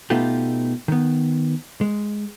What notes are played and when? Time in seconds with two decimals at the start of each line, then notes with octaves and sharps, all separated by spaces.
0.10 B2 A3 B3 D#4 F4 G4
0.88 D#3 B3
1.81 G#3